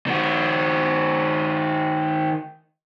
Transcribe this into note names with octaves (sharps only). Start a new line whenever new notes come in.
D#3 F#4